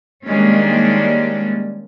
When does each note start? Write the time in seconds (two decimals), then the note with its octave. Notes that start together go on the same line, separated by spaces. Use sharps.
0.24 D#3 G3 G#3 A#3 C#4 D4